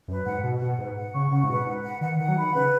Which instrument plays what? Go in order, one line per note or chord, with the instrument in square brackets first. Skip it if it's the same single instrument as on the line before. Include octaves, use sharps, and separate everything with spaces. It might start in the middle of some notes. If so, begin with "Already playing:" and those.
[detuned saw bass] F#2 [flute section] B4
[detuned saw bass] G#2 [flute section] F#5
[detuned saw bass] B2 [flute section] F#5
[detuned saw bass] B2 [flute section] F#5
[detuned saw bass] G#2 [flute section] B4
[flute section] F#5
[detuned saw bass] C#3 [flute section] C#6
[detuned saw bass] C#3 [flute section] F#5
[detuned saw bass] G#2
[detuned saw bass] B2 [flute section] B4
[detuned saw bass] B2
[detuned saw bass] G#2 [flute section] B4
[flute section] F#5
[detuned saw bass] D#3 [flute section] F#5
[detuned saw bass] D#3 [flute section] F#5
[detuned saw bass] F#3
[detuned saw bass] D#3 [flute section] B5
[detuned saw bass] C#3 [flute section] B4